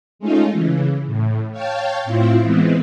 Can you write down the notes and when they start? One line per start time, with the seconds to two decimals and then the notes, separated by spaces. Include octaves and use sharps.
0.19 G#3 A3 C#4 D#4 F4
0.52 C#3 E3
1.06 A2
1.52 C#5 F5 G5 A5
2.04 A2 C4 E4 F4
2.40 E3 G#3 B3 C4